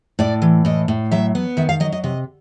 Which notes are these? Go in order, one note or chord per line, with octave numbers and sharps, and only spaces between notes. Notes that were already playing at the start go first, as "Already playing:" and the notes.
A2 D5
E3
A2 D#5
A2
F#3 E5
B3
D#3 E5
F5
F#3 D#5
D#5
C3 D#5